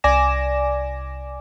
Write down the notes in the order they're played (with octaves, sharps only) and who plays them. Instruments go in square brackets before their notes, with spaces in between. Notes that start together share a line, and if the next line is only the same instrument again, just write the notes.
[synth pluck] C2 D5 G#5 D6 A#6 E7